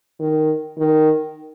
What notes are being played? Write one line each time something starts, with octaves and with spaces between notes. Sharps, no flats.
D#3
D#3